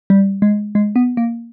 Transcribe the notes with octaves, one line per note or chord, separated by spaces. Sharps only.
G3
G#3
G#3
B3
A#3